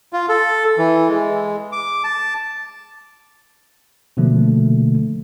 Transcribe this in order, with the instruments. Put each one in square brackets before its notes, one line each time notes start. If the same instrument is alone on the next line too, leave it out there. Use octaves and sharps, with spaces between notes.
[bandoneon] F4
A4
E3
G#3
D6
A5
[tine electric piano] B2 D3 F3 A3 A#3